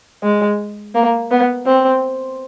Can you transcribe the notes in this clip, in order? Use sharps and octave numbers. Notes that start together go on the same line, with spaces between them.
G#3
A#3
B3
C4